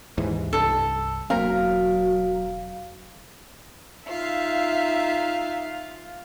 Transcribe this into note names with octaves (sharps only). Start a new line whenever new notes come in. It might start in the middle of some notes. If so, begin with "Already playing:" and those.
D#2 G#2 E3
C2 G2 A4
E1 F#3 A#3 C4 A#4 F5
D#4 F4 E5 F5